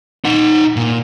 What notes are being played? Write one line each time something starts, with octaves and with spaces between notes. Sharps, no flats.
D#4 F#5
A#2